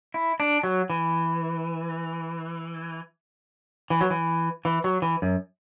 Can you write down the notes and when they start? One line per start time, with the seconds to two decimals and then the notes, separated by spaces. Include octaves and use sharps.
0.14 E4
0.40 D4
0.63 F#3
0.90 E3
3.90 E3
4.01 F#3
4.10 E3
4.65 E3
4.84 F#3
5.02 E3
5.22 F#2